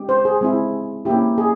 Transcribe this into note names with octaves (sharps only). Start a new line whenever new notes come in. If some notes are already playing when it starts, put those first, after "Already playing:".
Already playing: G#3 C#4 G4
C5
G#4
G#3 C4 E4
A#3 C#4 E4 G4
G#4